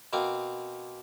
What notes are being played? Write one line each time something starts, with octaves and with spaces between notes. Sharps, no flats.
B2 A#3 C4